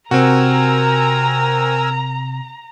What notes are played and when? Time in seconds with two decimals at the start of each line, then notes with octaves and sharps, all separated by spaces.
0.11 C3 C4 F#4 A#4 G#5 A#5 E6